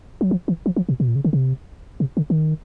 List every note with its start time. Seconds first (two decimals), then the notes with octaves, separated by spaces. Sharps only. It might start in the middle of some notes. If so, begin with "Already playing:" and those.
0.21 F#3
0.31 F3
0.48 E3
0.66 F3
0.76 F3
0.89 B2
1.00 B2
1.08 A#2
1.16 C#3
1.25 D3
1.33 C3
2.00 C3
2.17 D3
2.30 D3
2.34 D#3